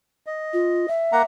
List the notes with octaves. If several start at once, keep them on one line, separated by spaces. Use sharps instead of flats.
D#5
F4
E5
A#3 F#5 A#5